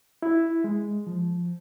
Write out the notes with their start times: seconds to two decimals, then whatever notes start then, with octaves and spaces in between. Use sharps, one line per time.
0.22 E4
0.64 G#3
1.07 F3